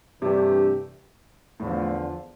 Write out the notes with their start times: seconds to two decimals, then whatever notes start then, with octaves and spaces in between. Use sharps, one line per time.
0.22 G2 C3 E3 A3 D4 G4
1.60 E2 A2 D3 F3